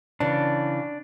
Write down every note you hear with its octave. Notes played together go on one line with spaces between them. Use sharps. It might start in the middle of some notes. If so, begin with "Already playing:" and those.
C#3 E3 D4